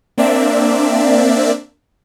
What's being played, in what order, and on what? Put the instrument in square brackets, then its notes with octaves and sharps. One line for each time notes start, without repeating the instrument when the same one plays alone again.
[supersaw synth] A#3 C4 D4 D5 E5